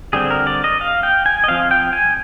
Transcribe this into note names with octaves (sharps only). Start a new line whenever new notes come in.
D3 G3 C4 G#4
A#4
D5
D#5
F5
G5
G#5
D#5
F3 C4 F5
G5
G#5